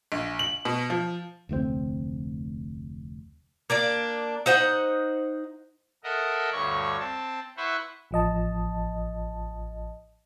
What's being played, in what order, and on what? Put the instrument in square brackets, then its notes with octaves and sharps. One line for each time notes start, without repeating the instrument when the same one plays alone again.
[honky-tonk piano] A#1
F#7
B2
F3
[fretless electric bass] F1 D2 A2 C4
[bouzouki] A#3 D4 D5
D#4 C5 D#5 F#5
[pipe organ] A4 A#4 D#5 E5 F#5
D2 G2 C#5 C#6
C4 A5
E4 B4 C5 E5 F#5 C#6
[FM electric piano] A1 F3 D#5 A5